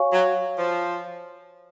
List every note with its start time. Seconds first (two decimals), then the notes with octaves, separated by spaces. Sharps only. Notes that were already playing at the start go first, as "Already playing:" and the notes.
Already playing: F#4 C#5 F5 G#5 C#6
0.13 F#3
0.57 F3